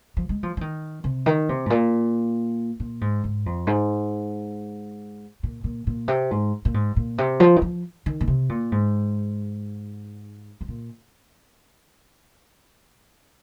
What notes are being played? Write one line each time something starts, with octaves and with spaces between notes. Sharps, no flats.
F3
G#3
F3
F3
D#3
C3
D#3
C3
G#2
A#2
A#2
G#2
G#2
F2
G#2
A#2
A#2
A#2
C3
G#2
A#2
G#2
A#2
C3
F3
D#3
F3
D#3
A#2
C3
A#2
G#2
G#2
A#2